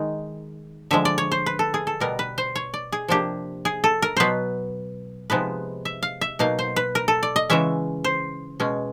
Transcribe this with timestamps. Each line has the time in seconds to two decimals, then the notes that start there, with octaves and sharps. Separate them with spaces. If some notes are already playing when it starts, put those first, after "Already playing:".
Already playing: D#3 G#3 D#4
0.91 D3 F3 G#3 E5
1.05 D5
1.18 C#5
1.32 C5
1.46 B4
1.59 A4
1.74 G#4
1.87 A4
2.00 B2 G3 B3 A#4
2.19 B4
2.38 C5
2.56 C#5
2.74 D5
2.92 G#4
3.08 C3 F3 A#3 D4 G4
3.65 G#4
3.84 A4
4.02 A#4
4.17 B2 F#3 B3 B4 C5
5.30 C3 F3 G#3 B3 D#4 B4
5.85 E5
6.03 F5
6.21 E5
6.39 B2 F#3 A#3 D#4 F5
6.59 C5
6.76 B4
6.95 A#4
7.08 A4
7.23 D5
7.36 D#5
7.50 C#3 E3 G#3 C#4 E5
8.04 C5
8.60 B2 G#3 C#4